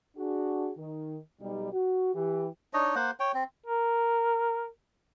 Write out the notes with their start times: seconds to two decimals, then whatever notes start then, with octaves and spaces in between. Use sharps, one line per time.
0.17 D4 F#4 G#4
0.78 D#3
1.41 B1 G3 D#4
1.73 F#4
2.15 E3 G4
2.73 D4 D#4 C#5 D#5
2.95 A#3 C5 F#5
3.20 C#5 G5
3.34 C4
3.67 A#4